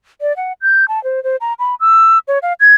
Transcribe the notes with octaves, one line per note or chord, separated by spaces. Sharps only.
D5
F#5
G6
A5
C5
C5
A#5
B5
E6
C#5
F5
G#6